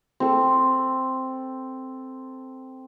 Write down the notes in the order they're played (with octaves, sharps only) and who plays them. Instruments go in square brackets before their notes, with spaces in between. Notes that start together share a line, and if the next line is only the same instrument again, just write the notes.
[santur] C4 A4